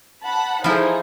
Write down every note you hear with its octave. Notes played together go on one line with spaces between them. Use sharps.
F#5 A5 B5
F3 D#4 E4 G#4 A4